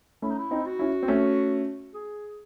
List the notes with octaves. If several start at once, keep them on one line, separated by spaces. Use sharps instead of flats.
A3 C#4 E4
D#4
E4
C4 D#4
F#4
C#4 E4
C4
A3 C#4
G#4